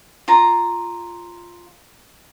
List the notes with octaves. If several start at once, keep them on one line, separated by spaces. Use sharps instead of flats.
F4 A#5